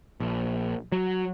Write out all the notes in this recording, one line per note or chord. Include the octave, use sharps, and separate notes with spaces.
A#1
F#3